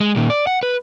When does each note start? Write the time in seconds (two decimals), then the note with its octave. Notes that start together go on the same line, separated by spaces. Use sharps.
0.01 G#3
0.16 A#2 D#3
0.30 D5
0.47 F#5
0.63 B4